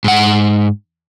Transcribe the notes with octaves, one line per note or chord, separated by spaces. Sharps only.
G#2 F#5